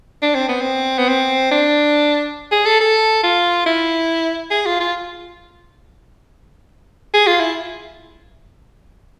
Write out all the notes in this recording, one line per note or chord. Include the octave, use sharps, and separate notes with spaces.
D4
C4
B3
C4
B3
C4
D4
G#4
A4
A4
F4
E4
G#4
F4
F4
G#4
F4
E4